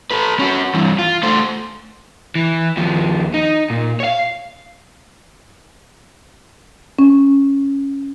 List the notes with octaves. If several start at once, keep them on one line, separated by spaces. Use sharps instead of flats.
A4 B4
C#4 F#4
G2 E3
F4
A3 C5
E3
D#2 F3
D#4
A#2
C#5 F5
C#4